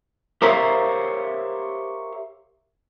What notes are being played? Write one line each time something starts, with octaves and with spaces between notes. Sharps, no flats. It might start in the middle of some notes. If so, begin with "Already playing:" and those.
G4 A#4 C5 C#5 E5 F5